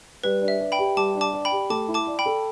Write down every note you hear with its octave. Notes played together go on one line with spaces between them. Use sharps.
G3 B4
D4
E5
D5
G5 B5
G4
G3 A5 D6
D4
A5 D6
D5
G5 B5
G4
A3 A5 D6
E4
A5 D6
D5
G5 B5
A4